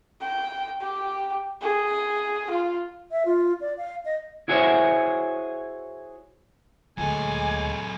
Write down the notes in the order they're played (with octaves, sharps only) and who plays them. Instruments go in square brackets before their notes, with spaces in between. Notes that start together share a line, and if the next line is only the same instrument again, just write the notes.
[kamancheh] G5
G4
G#4
F4
[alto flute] E5
F4
D5
F5
D#5
[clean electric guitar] E4 F#4 G#4 C5 C#5 E5
[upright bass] D2 A#2 [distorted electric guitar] F#3 A4 [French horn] G#3 [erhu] G#5